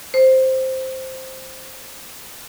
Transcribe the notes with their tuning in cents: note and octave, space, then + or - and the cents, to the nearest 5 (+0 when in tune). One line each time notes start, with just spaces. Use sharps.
C5 +0